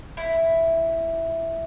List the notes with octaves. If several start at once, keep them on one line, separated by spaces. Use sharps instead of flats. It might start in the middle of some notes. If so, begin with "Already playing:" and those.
E4